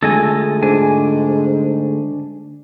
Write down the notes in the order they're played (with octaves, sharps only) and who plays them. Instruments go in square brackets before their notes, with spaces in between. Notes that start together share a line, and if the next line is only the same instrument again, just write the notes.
[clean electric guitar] D3 G#3 A3 [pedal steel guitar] A4 D#5 G#5
[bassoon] G#2 [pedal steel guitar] D4 G#5